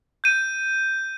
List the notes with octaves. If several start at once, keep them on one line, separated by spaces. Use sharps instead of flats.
G6 D#7